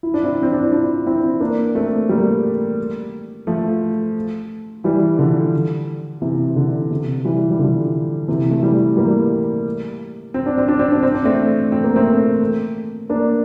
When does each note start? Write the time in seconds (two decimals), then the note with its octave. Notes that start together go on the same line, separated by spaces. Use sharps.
0.03 E4
0.14 D4
0.24 C4 E4
0.43 C4
0.52 D4
0.62 E4
0.72 D4 F4
1.06 C4 E4
1.40 A#3 D4
1.75 A3 C4
2.09 G3 A#3
3.47 F3 A3
4.84 E3 G3
5.19 D3 F3
6.22 C3 E3
6.56 D3
6.91 C3
7.25 E3 G3
7.51 G3
7.59 D3 F3
8.28 C3 E3
8.51 A3
8.63 E3 G3
8.97 G3 A#3
10.34 C4
10.46 D4
10.58 C4
10.68 D4
10.79 C4
10.91 D4
11.03 C4
11.14 D4
11.25 A3 C4
11.72 C4
11.84 A#3
11.96 A3 C4
13.10 A#3 D4